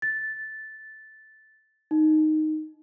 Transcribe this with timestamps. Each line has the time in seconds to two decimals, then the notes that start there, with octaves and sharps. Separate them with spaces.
0.02 A6
1.91 D#4